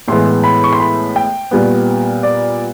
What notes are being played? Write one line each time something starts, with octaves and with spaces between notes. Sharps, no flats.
A2 E3 G#3 B3 C6
B5
C#6
C6
B5
G5
A#2 G3 B3
D5